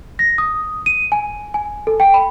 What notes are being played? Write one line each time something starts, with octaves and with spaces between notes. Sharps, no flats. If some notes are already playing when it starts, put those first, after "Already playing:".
A#6
D#6
D#7
G#5
G#5
A4
G5
B5